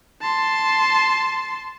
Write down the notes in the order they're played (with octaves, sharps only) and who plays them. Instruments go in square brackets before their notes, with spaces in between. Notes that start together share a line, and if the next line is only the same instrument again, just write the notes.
[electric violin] A5 C6